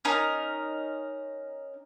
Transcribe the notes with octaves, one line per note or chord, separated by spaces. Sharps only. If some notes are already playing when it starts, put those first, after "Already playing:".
C#4 D#4 A#4